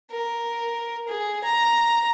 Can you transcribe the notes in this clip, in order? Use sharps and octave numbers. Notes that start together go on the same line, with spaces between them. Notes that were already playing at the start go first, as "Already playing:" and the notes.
A#4
G#4
A#5